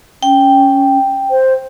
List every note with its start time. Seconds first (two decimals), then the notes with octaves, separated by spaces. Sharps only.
0.23 C#4 G5
1.31 C5